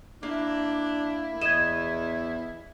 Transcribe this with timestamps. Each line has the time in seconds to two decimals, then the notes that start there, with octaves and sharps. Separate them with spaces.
0.23 A#3 D4 E4
1.41 E2 D#5 G#6 E7